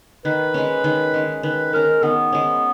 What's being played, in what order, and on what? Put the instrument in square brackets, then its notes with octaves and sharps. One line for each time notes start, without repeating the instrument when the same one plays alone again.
[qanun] D#3 [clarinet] B4
[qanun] G#3 C#4
D#3
G#3 C#4
[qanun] D#3 [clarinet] B4
[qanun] G#3 C#4 [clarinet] A#4
[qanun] D#3 [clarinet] B3
[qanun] G#3 C#4